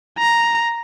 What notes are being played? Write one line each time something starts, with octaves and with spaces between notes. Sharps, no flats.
A#5